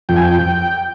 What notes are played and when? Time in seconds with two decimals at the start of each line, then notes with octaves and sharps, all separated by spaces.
0.09 F2 G5
0.16 G#5
0.24 G5